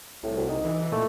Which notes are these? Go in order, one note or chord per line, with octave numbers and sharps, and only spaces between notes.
C2 A2
D2
D#4
E3
A#2 A3